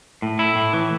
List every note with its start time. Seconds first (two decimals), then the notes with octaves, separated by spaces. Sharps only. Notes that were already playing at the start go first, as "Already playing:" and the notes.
0.22 A2
0.39 E4
0.56 A2
0.73 E3